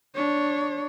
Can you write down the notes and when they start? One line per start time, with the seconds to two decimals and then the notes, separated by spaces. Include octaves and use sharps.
0.15 D4 C#5